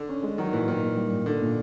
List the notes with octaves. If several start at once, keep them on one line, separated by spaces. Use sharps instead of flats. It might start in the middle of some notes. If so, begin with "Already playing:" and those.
Already playing: D3
C#4
G#3
D#3 F#3
A#2 E3
A#2 D#3
A#2
G3
A#2
A#2 D3
A#2